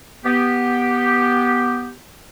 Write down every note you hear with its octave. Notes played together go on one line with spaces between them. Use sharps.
B3 G4